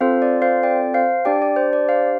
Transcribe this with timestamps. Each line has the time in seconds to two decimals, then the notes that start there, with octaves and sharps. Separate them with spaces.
0.01 C4 F4 A4 C5 F5
0.22 D5
0.42 C5 F5
0.63 D5 G5
0.94 C5 F5
1.25 D4 G4 D5 G5
1.42 D5
1.56 C5
1.73 D5
1.89 C5 F5